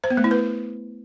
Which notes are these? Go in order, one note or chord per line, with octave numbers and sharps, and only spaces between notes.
C5
B3
A3
E4
B4